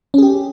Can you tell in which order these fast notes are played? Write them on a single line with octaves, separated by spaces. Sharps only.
C#4 G#4 G4